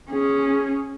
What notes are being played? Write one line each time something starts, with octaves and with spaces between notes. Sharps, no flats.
C#4 G#4